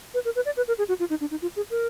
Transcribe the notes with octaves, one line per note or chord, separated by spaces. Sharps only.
B4
A#4
B4
D5
B4
A#4
G#4
F#4
F4
D#4
D4
D#4
F4
G#4
A#4